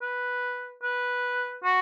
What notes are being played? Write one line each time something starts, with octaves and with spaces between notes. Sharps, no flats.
B4
B4
F#4